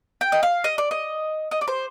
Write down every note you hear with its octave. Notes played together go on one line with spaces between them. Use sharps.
G5
D#5
F5
D#5
D5
D#5
D#5
D5
C5